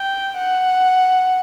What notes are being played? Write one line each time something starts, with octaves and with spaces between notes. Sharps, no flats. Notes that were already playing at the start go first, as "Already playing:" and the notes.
Already playing: G5
F#5